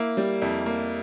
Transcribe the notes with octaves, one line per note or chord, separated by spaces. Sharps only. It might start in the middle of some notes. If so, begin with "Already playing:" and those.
Already playing: A#3 E4
G3
F2 E4
A#3